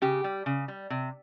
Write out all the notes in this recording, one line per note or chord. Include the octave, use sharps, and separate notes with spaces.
C#3 G4
G3
C#3
G3
C3